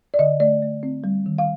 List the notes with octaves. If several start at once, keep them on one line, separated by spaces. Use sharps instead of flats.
D5
D3 D#5
A3 D5
A3
C4
G3
D#3
F5